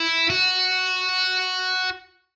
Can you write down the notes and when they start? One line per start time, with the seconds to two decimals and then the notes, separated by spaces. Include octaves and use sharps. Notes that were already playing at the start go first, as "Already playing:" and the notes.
Already playing: E4
0.30 F#4